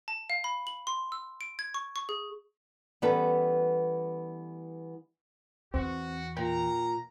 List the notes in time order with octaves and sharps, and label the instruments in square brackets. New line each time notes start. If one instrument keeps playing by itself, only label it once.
[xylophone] A5
F5
B5
F#7
C6
E6
D7
G#6
C#6
C#6
G#4
[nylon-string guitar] E3 G3 B3 C#4 A4 B4
[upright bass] E2 [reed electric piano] C4 [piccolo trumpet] F#4
[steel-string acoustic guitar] A#2 [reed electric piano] G5 [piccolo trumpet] A#5